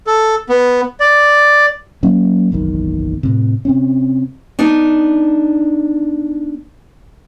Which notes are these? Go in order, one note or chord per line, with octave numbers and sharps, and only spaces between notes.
A4
B3
D5
F#3 A#3 C#4
F#1 B1 E2 D#3
A2 C3
C3 C4 C#4
B3 D4 D#4